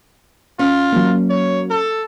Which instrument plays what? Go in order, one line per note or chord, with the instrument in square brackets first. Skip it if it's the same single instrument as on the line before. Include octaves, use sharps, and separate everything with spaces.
[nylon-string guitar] C#4 [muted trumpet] F4
[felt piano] F#3 A#3
[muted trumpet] C#5
A4